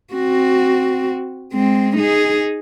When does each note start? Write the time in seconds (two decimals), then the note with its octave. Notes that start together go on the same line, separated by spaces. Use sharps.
0.14 C4 F#4
1.53 G#3 C4
1.97 D#4 G#4